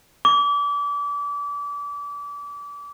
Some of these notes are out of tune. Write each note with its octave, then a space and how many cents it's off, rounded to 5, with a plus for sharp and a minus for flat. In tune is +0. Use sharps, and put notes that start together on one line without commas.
D6 -30